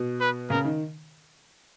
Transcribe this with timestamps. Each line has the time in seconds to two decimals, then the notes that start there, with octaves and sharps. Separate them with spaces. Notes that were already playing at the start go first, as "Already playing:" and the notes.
Already playing: B2
0.21 B4
0.50 C#3 A#4
0.65 D#3